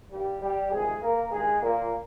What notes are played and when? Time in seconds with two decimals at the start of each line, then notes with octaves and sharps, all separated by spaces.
0.12 G2 D#3 G3 G4
0.41 G3 G4
0.71 F2 C3 D#3 G#3 G#4
1.02 A#3 A#4
1.31 G2 D#3 G#3 G#4
1.62 A#2 A#3